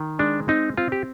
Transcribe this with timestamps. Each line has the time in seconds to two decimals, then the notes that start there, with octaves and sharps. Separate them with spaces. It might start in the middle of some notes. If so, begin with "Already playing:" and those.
Already playing: D#3
0.19 G#3 D4
0.48 C4 D#4
0.77 C4 F4
0.92 G4